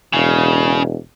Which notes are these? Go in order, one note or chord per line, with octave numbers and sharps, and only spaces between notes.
E1 C#3